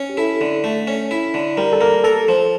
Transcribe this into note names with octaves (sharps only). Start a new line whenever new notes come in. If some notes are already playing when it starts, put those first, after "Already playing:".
Already playing: C#4
G4
E4 A4
D3
A3
C#4
E4
D3
G3 A#4
A4
A#3 A#4
A4 A#4
F3